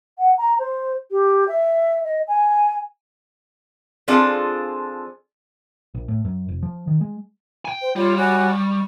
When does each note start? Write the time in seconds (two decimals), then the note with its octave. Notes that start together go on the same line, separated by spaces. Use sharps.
0.19 F#5
0.38 A#5
0.59 C5
1.11 G4
1.48 E5
2.04 D#5
2.28 G#5
4.08 F3 C4 D4 F4 G#4 A4
5.95 A#1
6.08 A2
6.25 F#2
6.49 F1
6.62 F3
6.88 D#3
7.01 G#3
7.65 G5 G#5
7.81 C5
7.96 G3 F4 C#5
8.17 F#4 C#5 G#5
8.49 C#6